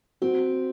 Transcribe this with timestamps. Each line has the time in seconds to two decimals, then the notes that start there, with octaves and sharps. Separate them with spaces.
0.22 C4 F#4